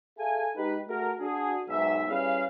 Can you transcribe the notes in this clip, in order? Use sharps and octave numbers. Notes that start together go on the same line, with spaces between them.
G#4 A4 E5 F5 G#5
G#3 D#4 G4 B4
A3 F#4 G#4 A#4
D4 F#4 G#4
B1 G#2 E5
G3 C#4 E4 G#4 B4 F5